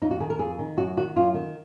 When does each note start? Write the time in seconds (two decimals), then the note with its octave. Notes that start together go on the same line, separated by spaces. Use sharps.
0.02 F2 D#4
0.11 F#4
0.20 D#3 G#4
0.30 A#4
0.39 F2 G#4
0.59 D#3
0.77 F#2 F#4
0.97 D#3 F#4
1.16 F#2 F4
1.34 D#3